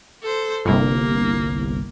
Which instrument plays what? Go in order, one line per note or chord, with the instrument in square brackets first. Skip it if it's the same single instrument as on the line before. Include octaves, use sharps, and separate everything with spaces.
[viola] A4 C5
[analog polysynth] G1 C2 [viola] A#3